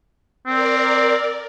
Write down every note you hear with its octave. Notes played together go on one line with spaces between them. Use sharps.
C4 A#4 D5